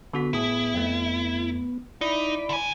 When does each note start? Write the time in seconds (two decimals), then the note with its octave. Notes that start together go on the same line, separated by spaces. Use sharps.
0.13 D3 B3 F#4 B6
0.33 A2 E4 G#4 D#6
0.74 F2 A3
2.01 D#4 E4 D5 B5
2.49 D3 G#5